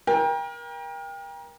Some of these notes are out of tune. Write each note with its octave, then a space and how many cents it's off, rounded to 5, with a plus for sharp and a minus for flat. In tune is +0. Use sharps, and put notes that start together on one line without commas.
A#4 +30 G5 +25